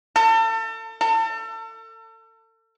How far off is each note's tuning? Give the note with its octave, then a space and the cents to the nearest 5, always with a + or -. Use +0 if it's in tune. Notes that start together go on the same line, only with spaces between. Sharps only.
A4 +35
A4 +35